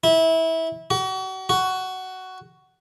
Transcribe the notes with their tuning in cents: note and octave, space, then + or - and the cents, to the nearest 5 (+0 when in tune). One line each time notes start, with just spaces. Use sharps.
E4 -20
F#4 +35
F#4 +10